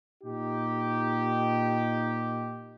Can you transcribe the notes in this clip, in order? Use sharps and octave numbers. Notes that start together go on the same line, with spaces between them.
A#2 D#4 G4